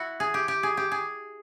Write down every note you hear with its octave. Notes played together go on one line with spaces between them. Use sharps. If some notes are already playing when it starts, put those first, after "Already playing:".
Already playing: E4 F#4
G#4
G4
G4
G#4
G4
G#4